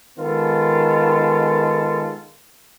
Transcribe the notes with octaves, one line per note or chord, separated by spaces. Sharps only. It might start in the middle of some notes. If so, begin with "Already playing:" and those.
D#3 G#3 B3 F4 A4